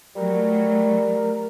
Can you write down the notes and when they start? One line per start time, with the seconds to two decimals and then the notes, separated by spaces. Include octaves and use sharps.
0.16 F#3 G3 A3 A#4